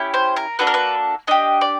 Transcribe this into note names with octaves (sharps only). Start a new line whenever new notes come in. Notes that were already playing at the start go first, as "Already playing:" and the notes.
Already playing: C#4 E4 G4
C5
A#4
A#3 D4 F#4 A4 B4
A#4
B4
D4 G4 D#5
D5